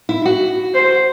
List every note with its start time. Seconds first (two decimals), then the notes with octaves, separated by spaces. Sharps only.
0.09 E4
0.25 F#4
0.75 C5